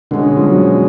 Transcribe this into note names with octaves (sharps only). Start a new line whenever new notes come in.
B2 D3 G#3 C#4
F3
F#3